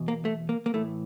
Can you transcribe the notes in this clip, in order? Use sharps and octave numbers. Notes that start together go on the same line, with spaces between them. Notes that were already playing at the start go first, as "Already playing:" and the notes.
Already playing: E2 B2
A#3
A3
A#3
A#3
A2 E3 A3